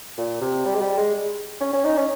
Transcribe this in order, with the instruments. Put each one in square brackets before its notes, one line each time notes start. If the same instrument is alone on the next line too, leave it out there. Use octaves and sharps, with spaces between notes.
[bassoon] A#2
C3
G3
G#3
G3
G#3
C#4
C#4
D#4
C#4